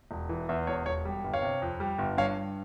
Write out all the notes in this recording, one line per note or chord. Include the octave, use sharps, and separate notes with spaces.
E1
E3
E2 E5
E1 C#5
E1 C#5
G3
G1
C#5 F5
C3
F2
G3
G1
G2 C#5 F5
G2